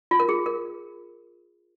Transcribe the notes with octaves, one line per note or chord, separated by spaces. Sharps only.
F4
A#4
G#4
A#4